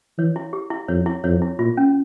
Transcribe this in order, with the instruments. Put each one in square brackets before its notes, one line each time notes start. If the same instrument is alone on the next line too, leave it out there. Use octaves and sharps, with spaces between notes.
[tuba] E3 [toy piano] C#5
[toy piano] E4
G4
E4
[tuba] F2 [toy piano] C#5
[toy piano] E4
[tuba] F2 [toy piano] C#5
[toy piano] E4
[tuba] A#2 [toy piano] F4
[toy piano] C#4